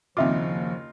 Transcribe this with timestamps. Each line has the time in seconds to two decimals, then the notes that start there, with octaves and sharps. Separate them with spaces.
0.17 F#1 D#2 F3 C4 D#4 F4 E5 D6